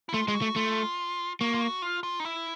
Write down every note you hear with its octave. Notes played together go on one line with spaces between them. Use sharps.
E4
A3 F4
G#3 F4
F#4
A3
A3 F4
A#3 F#4
F4
F#4
F4
F4
D#4
E4